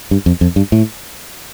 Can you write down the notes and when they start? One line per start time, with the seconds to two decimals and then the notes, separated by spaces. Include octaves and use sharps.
0.11 G2
0.26 F2
0.41 F2
0.56 G2
0.72 A2